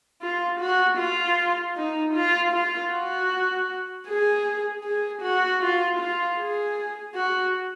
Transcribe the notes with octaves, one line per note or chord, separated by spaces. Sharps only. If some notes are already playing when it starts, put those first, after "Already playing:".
F4
F#4
F4
D#4
F4
F4
F#4
G#4
G#4
F#4
F4
F4
G#4
F#4